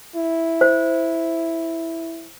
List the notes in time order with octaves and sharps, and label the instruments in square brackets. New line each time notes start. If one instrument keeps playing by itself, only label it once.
[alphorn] E4
[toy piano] C5